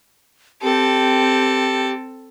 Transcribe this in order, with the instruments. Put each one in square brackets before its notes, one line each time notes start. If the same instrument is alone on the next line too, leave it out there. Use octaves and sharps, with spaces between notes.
[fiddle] C4 A4 [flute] G4